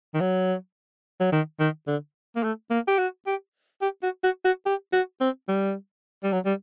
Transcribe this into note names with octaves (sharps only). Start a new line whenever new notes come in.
D#3
F#3
F#3
D#3
D#3
D3
A#3
A3
A#3
G4
F#4
G4
G4
F#4
F#4
F#4
G4
F#4
C4
G3
G3
F#3
G3